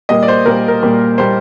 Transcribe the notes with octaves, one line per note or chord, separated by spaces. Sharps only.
A#2 G3 A#3 D#5
D5
C5
A#2 G3 A#3 A#4
A#4
A#2 G3 A#3
A#2 G3 A#3 C5